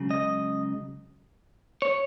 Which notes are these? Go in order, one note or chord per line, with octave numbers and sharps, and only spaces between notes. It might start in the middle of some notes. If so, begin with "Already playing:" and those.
Already playing: C#2 C#3 F#3
D#5
C#5